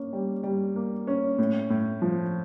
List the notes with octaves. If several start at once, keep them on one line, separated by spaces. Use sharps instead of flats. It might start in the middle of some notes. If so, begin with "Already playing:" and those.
Already playing: A#3 C#4
G3
G3
A#3
C#4
A2
A2
F3